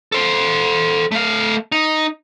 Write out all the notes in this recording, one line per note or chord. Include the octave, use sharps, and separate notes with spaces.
A4 C5
A3 F5
D#4